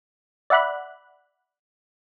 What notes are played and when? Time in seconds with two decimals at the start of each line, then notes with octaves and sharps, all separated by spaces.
0.50 D5 E5 F#5 B5 F#6